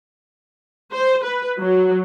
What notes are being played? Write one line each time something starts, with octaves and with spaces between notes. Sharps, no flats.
C5
B4
F#3